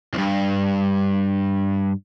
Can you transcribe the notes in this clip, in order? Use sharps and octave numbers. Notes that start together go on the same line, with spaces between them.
C2 G2